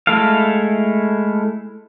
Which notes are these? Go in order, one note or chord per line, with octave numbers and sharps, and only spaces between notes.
G#3 A3 E4 A4 F5